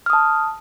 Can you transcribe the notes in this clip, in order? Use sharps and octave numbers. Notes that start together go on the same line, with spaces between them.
A5 D#6 F6